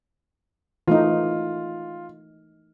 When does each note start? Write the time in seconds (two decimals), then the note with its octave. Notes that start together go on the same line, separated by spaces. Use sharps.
0.88 E3 A3 D#4 F4